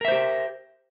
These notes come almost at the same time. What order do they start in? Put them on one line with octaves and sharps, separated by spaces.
A#4 E5 C5 G4